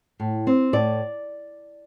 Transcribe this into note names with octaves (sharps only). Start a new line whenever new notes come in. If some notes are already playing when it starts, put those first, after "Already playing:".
A2
C4
A2 D5